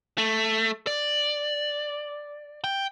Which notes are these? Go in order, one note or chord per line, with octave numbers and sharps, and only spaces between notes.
A3
D5
G5